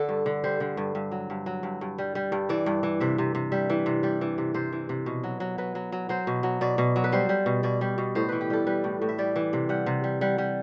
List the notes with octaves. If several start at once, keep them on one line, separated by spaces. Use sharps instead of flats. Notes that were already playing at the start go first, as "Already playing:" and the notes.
Already playing: D3 A4
G2
D3
G3 C5
D3
G2
G2
F#3
G2
F#3
G2
G2
G3
G3
G2
E3 D5
G2
E3
C3 E5
C3
C3
G3 E5
E3
C3
G3 D5
E3
C3
C3 C5
E3
C3
B2
F#3
F#3
F#3 B4
F#3
F#3
F#3 C5
B2
F#3
B2 D5
B2
F#3
B4
G3 C5
G3
B2
B2 D5
G3
B2
A2 C5
E3 B4
G4
G3 A4
G3 B4
A2
A2
E5
G3 D5
E3
C3
G3 F#5
C3
G3
G3 F#5
G3